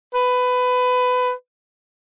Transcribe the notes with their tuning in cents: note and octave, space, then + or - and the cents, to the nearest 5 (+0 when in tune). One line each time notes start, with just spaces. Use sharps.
B4 +20